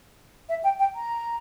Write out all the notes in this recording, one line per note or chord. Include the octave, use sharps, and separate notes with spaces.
E5
G5
G5
A#5